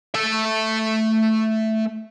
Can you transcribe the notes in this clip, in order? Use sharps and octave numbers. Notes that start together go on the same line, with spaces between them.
A3 E5